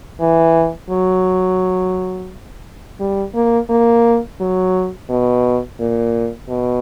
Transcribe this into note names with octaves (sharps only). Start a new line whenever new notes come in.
E3
F#3
G3
A#3
A#3
F#3
B2
A#2
B2